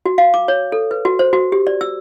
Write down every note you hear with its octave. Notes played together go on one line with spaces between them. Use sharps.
F#4
F5
D6
C#5
A4
B4
F#4
C5
F#4
G4
D5
E6